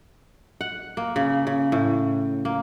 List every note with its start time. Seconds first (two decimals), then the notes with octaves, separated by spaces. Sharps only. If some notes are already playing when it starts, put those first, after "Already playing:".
0.61 F#5
0.97 A#3
1.16 C#3
1.47 C#3
1.72 A2
2.45 A#3